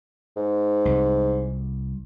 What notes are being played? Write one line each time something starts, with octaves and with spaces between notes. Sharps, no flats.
G#2
C2